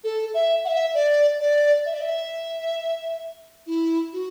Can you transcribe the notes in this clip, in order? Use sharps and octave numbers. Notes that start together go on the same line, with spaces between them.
A4
E5
F#5
E5
D5
D5
E5
D5
E5
E4
F#4